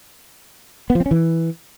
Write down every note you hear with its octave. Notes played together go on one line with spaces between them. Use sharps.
B3
F3
C4
C#4
E3